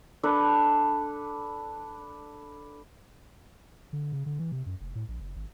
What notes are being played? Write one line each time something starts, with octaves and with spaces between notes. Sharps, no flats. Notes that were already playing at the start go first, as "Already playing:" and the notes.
D4 A4 B4
D3
C#3
D3
E3
C3
F#2
F1
A2
A#1
F#1
G#1